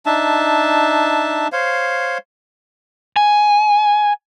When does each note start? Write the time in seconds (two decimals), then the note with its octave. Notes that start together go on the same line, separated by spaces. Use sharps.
0.06 D4 D#4 E5 A5
1.52 C5 C#5 F5
3.16 G#5